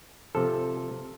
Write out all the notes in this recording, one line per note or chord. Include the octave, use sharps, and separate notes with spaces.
C3 F3 A4